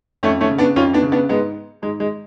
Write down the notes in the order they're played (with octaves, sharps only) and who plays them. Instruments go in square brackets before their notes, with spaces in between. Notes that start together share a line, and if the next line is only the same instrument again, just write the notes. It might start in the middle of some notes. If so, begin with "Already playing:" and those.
[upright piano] F2 A3 C#4
A3 C#4
C#3
B3 D4
F2 C#4 F4
B3 D4
C#3
B3 D4
G#2 G#3 B3
G#2 G#3
G#3